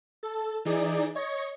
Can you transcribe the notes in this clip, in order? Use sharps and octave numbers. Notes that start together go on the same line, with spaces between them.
A4
E3 D#4 G#4 D5
C#5 D#5 C#6 G#6 C#7